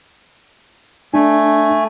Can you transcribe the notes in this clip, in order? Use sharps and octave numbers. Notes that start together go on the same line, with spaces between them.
A3 D4 G#5